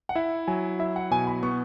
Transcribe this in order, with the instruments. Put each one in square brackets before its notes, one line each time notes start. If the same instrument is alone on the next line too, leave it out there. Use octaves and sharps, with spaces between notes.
[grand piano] F#5
[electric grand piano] E4 [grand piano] E5
[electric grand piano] F#3 [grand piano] G#5
[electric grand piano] E4 [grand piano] E5
[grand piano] F#5
[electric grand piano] B2 [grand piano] G#5
[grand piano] B5
[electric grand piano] B3 [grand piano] C#6